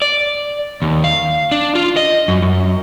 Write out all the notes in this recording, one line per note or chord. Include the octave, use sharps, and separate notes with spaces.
D5
D#2
F5
D4
F4
D#5
F#2
F#2